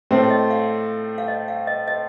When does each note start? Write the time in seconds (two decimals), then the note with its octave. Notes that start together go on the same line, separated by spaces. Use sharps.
0.11 A2 A3 C4 C5
0.20 C#5
0.31 D#5
0.51 F5
1.18 F5
1.28 D#5
1.48 F5
1.67 D#5
1.88 D#5